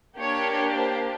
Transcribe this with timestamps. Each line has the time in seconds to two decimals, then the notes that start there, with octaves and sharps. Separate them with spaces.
0.19 A#3 D4 G4 C#5
0.75 C5